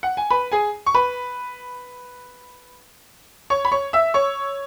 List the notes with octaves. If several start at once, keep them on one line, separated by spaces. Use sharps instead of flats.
F#5
G#5
B4 B5
G#4 G#5
C#6
B4 B5
C#5 C#6
B5
C#5 C#6
E5 E6
C#5 C#6